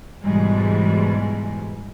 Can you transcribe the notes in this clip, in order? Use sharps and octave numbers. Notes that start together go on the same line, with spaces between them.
G#2 B2 E3 G3 G#3